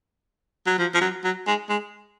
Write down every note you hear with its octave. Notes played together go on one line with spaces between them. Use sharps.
F#3
F3
F3
F#3
F#3
G#3
G#3